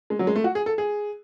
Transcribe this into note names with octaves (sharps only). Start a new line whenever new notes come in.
G#3
F#3
G#3
A3
F#4
G#4
A4
G#4